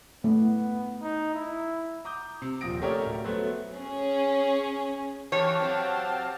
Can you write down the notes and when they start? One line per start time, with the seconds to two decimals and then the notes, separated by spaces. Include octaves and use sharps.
0.24 A3 B3
1.02 D#4
1.35 E4
2.05 A#5 D6 D#6 G6
2.42 C3
2.61 D#1 F3 D#6 A#6 D7
2.82 A3 C#4 G4 A#4 C#5 D5
3.06 D1
3.24 F#3 A3 B3 A4 B4 C5
3.75 C#4 G#4
5.32 E3 G4 C#5 F5 A5
5.60 F#3 C4